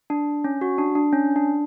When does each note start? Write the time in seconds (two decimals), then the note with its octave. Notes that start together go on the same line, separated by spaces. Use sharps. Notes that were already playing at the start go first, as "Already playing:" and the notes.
0.10 D4
0.44 C#4
0.61 F#4
0.78 D4
0.95 D4
1.13 C#4
1.36 D4